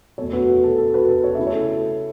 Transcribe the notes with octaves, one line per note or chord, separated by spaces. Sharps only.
E2 B2 A3 A4 C#5
F#4 B4
F#4
A4
A4
F#4 B4
A4
C#5
C#3 A3 E4 E5
A4 C#5